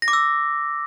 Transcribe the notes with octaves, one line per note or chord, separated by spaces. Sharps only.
A#6
D6
E6